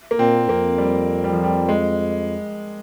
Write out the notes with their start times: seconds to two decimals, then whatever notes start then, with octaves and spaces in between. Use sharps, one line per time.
0.11 A#3
0.19 A#2 C4
0.49 F2 A#3
0.78 G3
1.24 G3
1.33 F3
1.44 G3
1.69 G#3